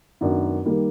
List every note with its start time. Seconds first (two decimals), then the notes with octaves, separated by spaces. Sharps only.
0.21 F#2 D#3 F#3 B3 D4
0.65 D#3 G3 A#3